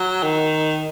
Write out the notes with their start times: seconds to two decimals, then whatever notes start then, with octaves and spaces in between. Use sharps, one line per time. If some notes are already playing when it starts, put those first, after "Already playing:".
Already playing: F#3
0.23 D#3